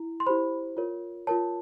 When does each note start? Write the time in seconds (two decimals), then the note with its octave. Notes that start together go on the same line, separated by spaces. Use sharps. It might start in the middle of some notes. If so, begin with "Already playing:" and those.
Already playing: E4
0.20 C6
0.26 E4 G4 C5 B5
0.77 F4 A#4 C#5
1.27 F4 A#4 C#5 A5